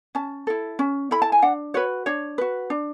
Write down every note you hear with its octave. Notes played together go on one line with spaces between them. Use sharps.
C#4 A5
E4 A4
C#4
E4 A4 B5
A5
G#5
D4 F#5
F#4 B4 C#5
D4 C#5
F#4 B4
D4